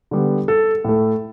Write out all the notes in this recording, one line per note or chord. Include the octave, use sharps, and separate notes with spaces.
D3 G3 B3
A4
A2 A3